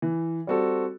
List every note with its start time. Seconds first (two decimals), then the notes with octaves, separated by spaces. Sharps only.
0.02 E3
0.47 G3 C4 F#4 A4